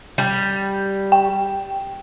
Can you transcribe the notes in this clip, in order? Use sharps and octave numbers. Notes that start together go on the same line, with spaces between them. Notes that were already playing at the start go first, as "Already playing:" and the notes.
G3
G5